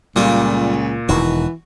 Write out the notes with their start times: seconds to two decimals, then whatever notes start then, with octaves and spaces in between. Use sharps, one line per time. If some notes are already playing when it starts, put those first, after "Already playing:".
0.16 C#2 A#2 G3 A3 F4
1.09 E1 D#3 E3 F#4